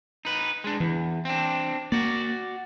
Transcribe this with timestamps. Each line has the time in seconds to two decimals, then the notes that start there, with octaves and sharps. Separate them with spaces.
0.25 D#4 B4
0.64 G#3 D4
0.80 E2 E3
1.25 C4 D4
1.92 A#3 F#4 D5